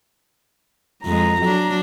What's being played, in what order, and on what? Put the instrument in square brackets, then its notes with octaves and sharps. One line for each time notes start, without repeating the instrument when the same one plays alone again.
[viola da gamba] F2 G#3 [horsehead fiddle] A#5
[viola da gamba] F#3 D4